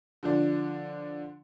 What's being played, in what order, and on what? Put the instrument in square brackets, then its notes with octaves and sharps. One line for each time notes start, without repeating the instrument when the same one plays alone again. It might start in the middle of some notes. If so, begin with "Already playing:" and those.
[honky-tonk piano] D3 F3 D4